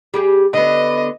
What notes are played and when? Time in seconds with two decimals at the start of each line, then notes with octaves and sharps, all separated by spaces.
0.14 G3 G4 G#4
0.53 D3 B3 D#5